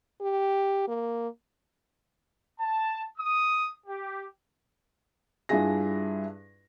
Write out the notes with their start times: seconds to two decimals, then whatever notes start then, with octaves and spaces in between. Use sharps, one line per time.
0.21 G4
0.88 A#3
2.59 A5
3.18 D#6
3.87 G4
5.49 G2 D4 E4 F4 G#4 A#6